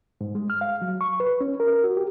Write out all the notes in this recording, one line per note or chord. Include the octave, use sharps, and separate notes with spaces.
G#2
G#3
F6
F5
F#3
C#6
B4
C#4
A#4
F#4
G4